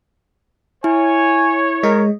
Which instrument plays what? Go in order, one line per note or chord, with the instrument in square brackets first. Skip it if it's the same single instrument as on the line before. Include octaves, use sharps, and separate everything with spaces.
[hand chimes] E4 [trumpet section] C#5 [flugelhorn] G#5
[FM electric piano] G#3 D#5 [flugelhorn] A#4